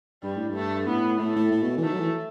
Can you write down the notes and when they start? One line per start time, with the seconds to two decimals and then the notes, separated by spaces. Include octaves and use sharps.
0.23 G2 G3
0.37 A2
0.50 G2 A3
0.87 A2 B3
1.19 A2 A3
1.35 A2
1.51 A2
1.62 B2
1.77 E3
1.83 D#3 A3
1.92 F#3
2.00 E3